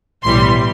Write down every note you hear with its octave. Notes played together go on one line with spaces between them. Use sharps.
B1 A2 E3 G3 C6